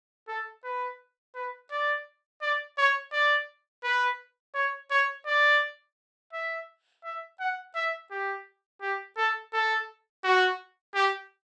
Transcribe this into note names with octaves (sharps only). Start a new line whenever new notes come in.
A4
B4
B4
D5
D5
C#5
D5
B4
C#5
C#5
D5
E5
E5
F#5
E5
G4
G4
A4
A4
F#4
G4